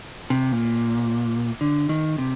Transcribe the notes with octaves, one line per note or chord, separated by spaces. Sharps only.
C3
A#2
D3
D#3
C3